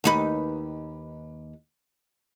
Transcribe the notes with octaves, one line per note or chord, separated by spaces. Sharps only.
D#2 D#4 B4